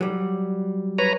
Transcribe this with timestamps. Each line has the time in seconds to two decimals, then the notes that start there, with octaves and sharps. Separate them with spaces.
0.01 F#3 G3
0.98 B4 C#5 A#5